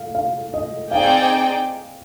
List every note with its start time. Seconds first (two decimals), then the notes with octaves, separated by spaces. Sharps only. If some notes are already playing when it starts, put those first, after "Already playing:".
Already playing: F5
0.15 F5
0.54 D#5
0.91 C4 D#4 G#4 D5 F5 G5